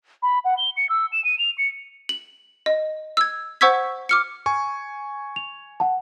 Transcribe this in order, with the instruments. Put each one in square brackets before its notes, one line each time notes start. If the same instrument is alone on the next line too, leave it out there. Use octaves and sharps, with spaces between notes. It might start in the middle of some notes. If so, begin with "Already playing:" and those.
[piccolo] B5
F#5
G7
C#7
E6
E7
D#7
F7
C#7
[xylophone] F#7
D#5
E6 G#6
C5 F#5 C#6 E6 G#6 B6
D6 F6 C#7
[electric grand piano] G#5 C#6
[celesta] F7
F#5 A5